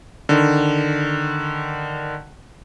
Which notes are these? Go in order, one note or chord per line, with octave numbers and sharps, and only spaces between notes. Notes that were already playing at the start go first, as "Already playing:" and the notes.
D3 D#3